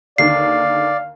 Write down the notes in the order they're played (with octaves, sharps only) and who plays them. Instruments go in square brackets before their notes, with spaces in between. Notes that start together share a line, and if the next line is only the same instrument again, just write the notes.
[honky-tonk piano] D#2 D3 D#3 [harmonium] D5 [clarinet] F5 [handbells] C7